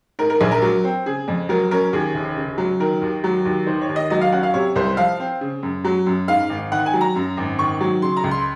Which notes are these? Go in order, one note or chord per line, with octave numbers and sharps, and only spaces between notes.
G#2 A#4
A#4
A#1 G#4
A#4
F#3
C4
C#3 G#4
F2
F#3 A#4
C#4 A#4
D#2 G#4
F1
C#3
F#3
D#3 A#4
D#2
F#3
D#2
D#3 C5
C#5
D#2
D#5
F#3 D#5
F5
C#4 F#5
F5
C3 C#5
C2 C5
F3 F5
C4
C#3
F#2
F#3
F#2
G#2 F5
G#1
D#3 F#5
G#5
F#3
A#5
F#2
G#1
D#3 C#6
F#3
C#3 C6
A#5
C#2
C6